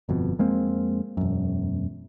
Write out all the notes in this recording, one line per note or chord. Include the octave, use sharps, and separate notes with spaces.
G1 F2 B2
F2 G#3 A#3 C4
E1 F#2